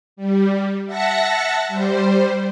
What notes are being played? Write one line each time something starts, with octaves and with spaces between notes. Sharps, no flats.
G3
E5 F#5 A5 A#6 C#7
G3 C5